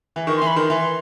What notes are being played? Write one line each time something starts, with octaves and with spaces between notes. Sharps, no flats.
E3
D#3 C#6
C6
E3
B5
D#3 C6
E3